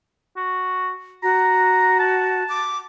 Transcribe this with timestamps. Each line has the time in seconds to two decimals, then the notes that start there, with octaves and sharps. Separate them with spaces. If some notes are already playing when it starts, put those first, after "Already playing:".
0.37 F#4
1.23 F#4 A#5
1.99 A5
2.49 D6